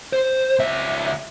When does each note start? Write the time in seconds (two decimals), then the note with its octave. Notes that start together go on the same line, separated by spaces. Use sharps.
0.13 C5
0.59 C#2 E5